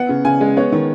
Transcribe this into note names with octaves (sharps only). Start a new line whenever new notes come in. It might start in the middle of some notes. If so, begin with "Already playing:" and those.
Already playing: B3 F#5
C#3
C#3 G#5
G#3
B3 C#5
D#3